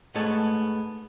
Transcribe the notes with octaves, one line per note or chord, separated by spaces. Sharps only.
G#2 G#3 A3 B3 C#5 A5